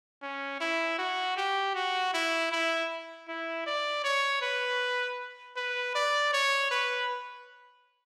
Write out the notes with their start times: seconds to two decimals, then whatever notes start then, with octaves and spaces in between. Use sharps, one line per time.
0.23 C#4
0.61 E4
0.99 F#4
1.37 G4
1.75 F#4
2.14 E4
2.52 E4
3.28 E4
3.67 D5
4.04 C#5
4.42 B4
5.57 B4
5.95 D5
6.33 C#5
6.71 B4